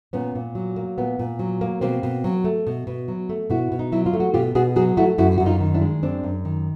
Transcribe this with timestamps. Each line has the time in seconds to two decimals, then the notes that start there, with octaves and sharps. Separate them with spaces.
0.13 A#2 B3 C#4
0.35 A#2
0.55 F#3
0.76 A#3
0.98 A#2 B3
1.19 A#2
1.39 F#3
1.61 A#3
1.81 B2 A#3 C4
2.03 B2
2.24 F#3
2.44 A3
2.67 B2
2.87 B2
3.08 F#3
3.29 A3
3.50 B2 E4 F#4
3.72 B2
3.79 D#4
3.92 F#3 E4
4.06 F4
4.13 A3
4.20 F#4
4.34 B2 F4 G4
4.55 B2 F#4 G#4
4.76 F#3 F#4 G#4
4.97 A3 E4 F#4
5.18 F#2 E4 F#4
5.38 F#2 F#4
5.46 D#4 F4
5.61 D#3
5.74 D4 E4
5.81 G#3
6.03 F#2 C4 D4
6.24 F#2
6.45 D#3